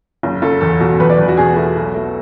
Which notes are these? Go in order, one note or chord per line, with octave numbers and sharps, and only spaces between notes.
F#1
F#1 A4
E2 A4
B2 F#4
E2 B4
D5
E2
F#4
B2 G#4
A3 F#4
B1
A3